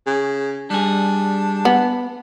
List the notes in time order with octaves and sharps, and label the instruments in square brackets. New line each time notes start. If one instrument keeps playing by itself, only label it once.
[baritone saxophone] C#3
[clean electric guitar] G3 G#4 [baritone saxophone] D4
[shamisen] B3